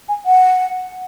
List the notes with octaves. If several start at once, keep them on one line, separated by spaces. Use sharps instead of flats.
G#5
F#5